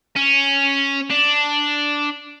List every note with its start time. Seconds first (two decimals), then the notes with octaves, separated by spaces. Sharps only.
0.16 C#4
1.11 D4